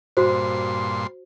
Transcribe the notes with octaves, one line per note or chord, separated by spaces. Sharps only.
G2 A#2 F#4 C5 C6